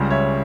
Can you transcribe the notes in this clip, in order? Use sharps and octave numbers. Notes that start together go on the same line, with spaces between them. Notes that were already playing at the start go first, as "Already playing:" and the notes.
Already playing: C#2 C#3 G3
C#5 E5